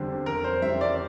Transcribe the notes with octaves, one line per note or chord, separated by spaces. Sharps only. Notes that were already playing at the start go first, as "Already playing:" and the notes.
Already playing: E2 D3 G3 C4
F2 A#4
C5
E3 G3 E5
D5